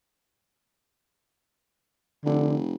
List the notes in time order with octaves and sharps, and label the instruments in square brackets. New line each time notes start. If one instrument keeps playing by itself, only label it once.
[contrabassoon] F1 [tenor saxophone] D3